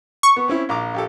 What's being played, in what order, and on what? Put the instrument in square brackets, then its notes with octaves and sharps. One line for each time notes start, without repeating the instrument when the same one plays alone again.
[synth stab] C#6
[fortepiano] B3
C4 C#4 E4
A#1 A#5 D6
A#1 G4 A4